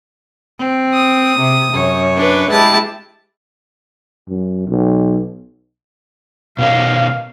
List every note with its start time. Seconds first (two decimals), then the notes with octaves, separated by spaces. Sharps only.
0.59 C4
0.94 D#6
1.39 C3
1.73 F#2 C#5
2.16 D4 B4
2.50 G#3 E4 G4 A5
4.29 F#2
4.68 B1
6.58 B2 C#4 A#4 F5